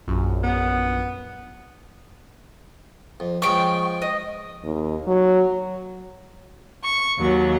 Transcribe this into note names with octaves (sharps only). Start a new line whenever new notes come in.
A#1 F#2
B3
F2
F3 G#3 C#4 G5 C#6
D#5
D#2
F#3
C#6
D#2 F#3